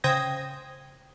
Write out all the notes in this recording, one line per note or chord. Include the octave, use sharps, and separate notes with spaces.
C#3 C5 G5 D#6 G#6 A#6